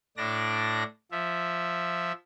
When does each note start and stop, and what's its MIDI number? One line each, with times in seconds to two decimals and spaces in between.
0.17 0.83 45
0.17 0.83 62
0.17 0.83 74
0.17 0.83 94
1.11 2.12 53
1.11 2.12 76